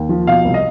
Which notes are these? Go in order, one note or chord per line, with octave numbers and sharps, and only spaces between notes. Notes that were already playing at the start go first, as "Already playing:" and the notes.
Already playing: D#2
F3
B2 F5
C2
D#5